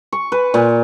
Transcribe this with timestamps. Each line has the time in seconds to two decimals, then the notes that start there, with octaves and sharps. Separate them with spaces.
0.13 C#6
0.32 B4
0.54 A#2